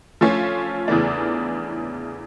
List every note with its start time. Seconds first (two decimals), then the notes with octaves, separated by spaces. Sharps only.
0.21 F3 A3 C#4 F4
0.88 E2 C#3 E3 A3 D4